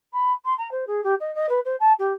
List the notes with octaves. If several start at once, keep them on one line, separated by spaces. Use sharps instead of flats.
B5
C6
A#5
C5
G#4
G4
D#5
D#5
B4
C5
A5
G4